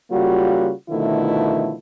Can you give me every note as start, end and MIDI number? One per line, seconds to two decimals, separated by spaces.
0.11 0.71 49
0.11 0.71 55
0.11 0.71 58
0.11 0.71 65
0.11 0.71 66
0.90 1.74 47
0.90 1.74 50
0.90 1.74 51
0.90 1.74 53
0.90 1.74 57
0.90 1.74 64